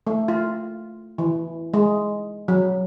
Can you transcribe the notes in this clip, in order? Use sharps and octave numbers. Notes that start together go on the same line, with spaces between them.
A3
F4
E3
G#3
F#3